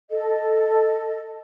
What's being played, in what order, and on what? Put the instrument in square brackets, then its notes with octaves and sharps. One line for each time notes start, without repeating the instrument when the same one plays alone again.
[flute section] A4 D#5